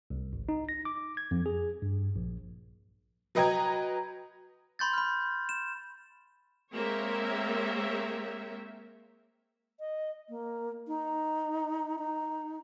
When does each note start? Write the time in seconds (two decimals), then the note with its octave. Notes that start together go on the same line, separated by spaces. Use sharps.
0.10 C2
0.33 G#1
0.49 D#4
0.69 A#6
0.85 D6
1.17 G#6
1.31 F2
1.46 G#4
1.82 G2
2.16 A#1
3.35 F#3 B4 D#5 G5 A#5 G#6
4.79 B5 C6 G6 A6
4.93 B5 F6
5.49 E7
6.73 G#3 A#3 C4 A#4 C#5 E5
9.80 D#5
10.29 A#3
10.87 D#4
11.99 D#4